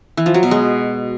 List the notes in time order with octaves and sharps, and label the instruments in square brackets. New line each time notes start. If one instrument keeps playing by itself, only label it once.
[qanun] E3
F3
F#3
B2
G#3